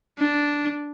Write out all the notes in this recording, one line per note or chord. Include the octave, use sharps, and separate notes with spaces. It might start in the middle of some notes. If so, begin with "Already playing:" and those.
D4